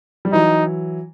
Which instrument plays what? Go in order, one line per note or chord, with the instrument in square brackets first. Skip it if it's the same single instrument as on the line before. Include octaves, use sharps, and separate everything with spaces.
[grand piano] G3
[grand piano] E3 F#3 [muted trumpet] D#4